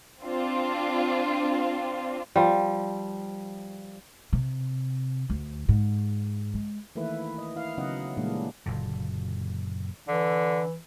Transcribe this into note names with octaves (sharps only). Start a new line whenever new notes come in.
C4 D4 F4
F3 G3
C3
D2
G#2
G#3
D#3 E3 A3 A#3 E4 B4
D#5
E4 F5
C#3 F#3 B3 D#4 D#5 F#5
A#2 E3 G3 G#3 A#3 D4
F#1 A#2 D3
D3 E3